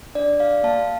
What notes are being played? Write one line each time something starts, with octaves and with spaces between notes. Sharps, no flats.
D4 D5
G4 D5 F5
A#3 F5 A5